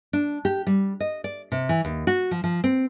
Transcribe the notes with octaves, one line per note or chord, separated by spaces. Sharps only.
D4
G4
G3
D#5
D5
C3
E3
D#2
F#4
F3
F3
C4